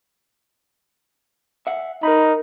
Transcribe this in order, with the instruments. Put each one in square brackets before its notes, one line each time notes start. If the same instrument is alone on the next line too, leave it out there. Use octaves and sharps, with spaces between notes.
[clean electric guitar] E5 F#5
[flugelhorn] D#4 [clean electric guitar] A#4 B5